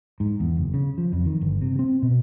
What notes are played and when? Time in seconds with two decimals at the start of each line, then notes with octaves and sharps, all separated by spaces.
0.20 G#2
0.40 E2
0.57 F#1
0.74 C#3
0.98 F3
1.13 F2
1.26 D#3
1.41 G1
1.62 C3
1.79 C4
2.02 B2